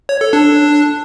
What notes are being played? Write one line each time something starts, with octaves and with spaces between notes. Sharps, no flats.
C#5
A4
D4